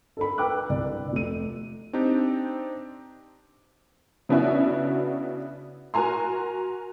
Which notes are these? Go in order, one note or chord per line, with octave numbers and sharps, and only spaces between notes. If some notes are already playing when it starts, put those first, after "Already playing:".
A4 A#4 B5
A#4 B4 G5 D6 E6 F#6
C2 D5
D3
F1 D#7
C4 D4 D#4 G4
C#3 B3 D4 E4 F#4
F#4 A#4 G#5 A#5 C6